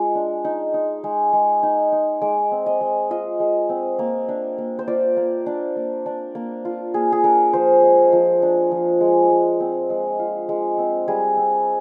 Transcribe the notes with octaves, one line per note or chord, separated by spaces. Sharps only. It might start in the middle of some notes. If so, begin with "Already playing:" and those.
Already playing: G#3 F4
D4
D#4
D#4
G#3
G#3
D#4
D#4
G#3 D6
C4
D#5
G#3
F4 D#5
G#3
C4
A#3
D4
A#3
C5
F4 D5
A#3
D4
A#3
D4
A#3
F4
A#3 G#4
G#4
D4 A#4
F3 C5
G#3
F3
D4
F3
G#3
G#3
C4
G#3
F4
G#3
C4
G3 G#4
C4